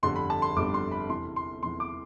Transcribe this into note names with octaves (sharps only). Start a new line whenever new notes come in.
G1 F2 D3 G3 C6
B5
A5
C6
G1 F2 D3 G3 D6
C6
B5
E2 C3 E3 C6
C6
E2 C3 E3 C6
D6